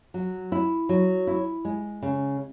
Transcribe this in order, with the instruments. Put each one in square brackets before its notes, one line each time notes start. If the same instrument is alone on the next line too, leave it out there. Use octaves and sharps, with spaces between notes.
[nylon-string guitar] F#3
E4
F#3
E4
G#3
C#3